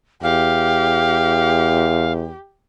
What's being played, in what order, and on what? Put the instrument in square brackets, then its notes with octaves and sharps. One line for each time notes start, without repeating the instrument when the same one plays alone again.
[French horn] E2 [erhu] G4 [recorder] F5